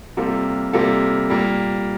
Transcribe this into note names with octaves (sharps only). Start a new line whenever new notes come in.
C3 G3 A#3 F4 A4
C3 G3 A#3 F4 A4
A#2 G3 A#3